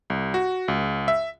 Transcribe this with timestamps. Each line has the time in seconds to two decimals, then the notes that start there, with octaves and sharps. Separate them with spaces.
0.10 C2
0.34 F#4
0.68 C#2
1.08 E5